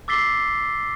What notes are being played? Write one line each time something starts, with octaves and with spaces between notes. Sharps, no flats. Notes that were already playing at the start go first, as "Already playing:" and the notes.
D6 E6 A6 B6 C7 G7